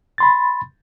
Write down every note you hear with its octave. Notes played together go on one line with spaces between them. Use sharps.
B5 C6 A6